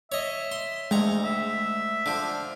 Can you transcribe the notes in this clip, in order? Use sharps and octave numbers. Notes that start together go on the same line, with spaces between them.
C#5 D#5 E5
C6
D2 G#3 A#5 C#6
E5
D3 F3